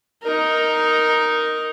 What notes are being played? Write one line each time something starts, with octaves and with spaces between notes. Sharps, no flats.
D#4 A#4